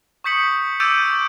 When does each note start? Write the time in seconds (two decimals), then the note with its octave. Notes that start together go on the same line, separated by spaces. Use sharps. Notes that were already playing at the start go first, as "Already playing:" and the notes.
0.24 C#6 D#6 G6 B6 C#7 F#7
0.80 D6 E6 G6 A6 D7 D#7